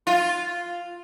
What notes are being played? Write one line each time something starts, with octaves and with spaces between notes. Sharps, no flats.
F4